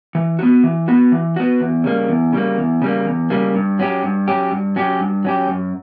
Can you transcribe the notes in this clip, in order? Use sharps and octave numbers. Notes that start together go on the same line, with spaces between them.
E3
B3 F#4
E3
B3 F#4
E3
B3 F#4
E2
C#3 G3 A#3
E2
C#3 G3 A#3
E2
C#3 G3 A#3
E2
C#3 G3 A#3
G2
F#3 C#4 G4
G2
F#3 C#4 G4
G2
F#3 C#4 G4
G2
F#3 C#4 G4
F#2